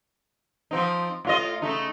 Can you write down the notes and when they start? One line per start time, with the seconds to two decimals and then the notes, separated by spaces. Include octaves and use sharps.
0.71 F3 C4 D#4
1.25 A2 F4 D#5
1.62 C#3 A3 D#4